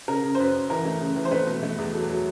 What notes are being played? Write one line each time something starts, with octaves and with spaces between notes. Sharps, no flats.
C#3 A#4
C#3
C5
F#2 B4
F#2
E3 A#4
A3
C#3
E3
C5
A3 B4
B2
A3
E2
F#3 A4
F#3